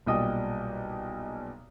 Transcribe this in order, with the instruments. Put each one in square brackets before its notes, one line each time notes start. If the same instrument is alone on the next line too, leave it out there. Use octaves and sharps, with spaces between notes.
[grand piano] B1 A#2 G3 D#5 G5 D#6